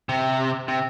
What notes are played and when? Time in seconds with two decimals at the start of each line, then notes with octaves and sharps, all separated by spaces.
0.09 C3
0.68 C3